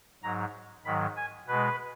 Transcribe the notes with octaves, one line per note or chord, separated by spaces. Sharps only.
G#2 F#3 A#5
G#2 D#3 F#3 B5
G#5
B2 G#3 B4